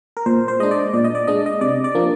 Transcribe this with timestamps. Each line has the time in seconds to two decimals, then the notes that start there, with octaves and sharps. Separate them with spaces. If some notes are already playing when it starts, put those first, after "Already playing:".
0.17 A#4
0.26 A#2 C5
0.48 C5
0.60 G#3 D4 D#5
0.71 D5
0.94 A#2 D5
1.04 D#5
1.15 D5
1.27 G#3 D4 D#5
1.46 D#5
1.61 C3 D5
1.84 D5
1.95 F3 A#3 D4